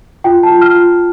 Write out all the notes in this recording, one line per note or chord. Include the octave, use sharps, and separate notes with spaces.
F4 G5
A5
F4
F6
F4